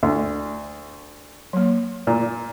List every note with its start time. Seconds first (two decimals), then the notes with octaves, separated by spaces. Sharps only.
0.03 D2
1.53 F#3 A#3
2.07 A#2